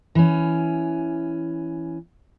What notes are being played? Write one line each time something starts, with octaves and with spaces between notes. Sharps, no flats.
E3 C#4